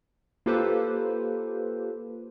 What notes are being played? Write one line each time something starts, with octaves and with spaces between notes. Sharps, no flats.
A#3 F4 G4 A4 B4 C5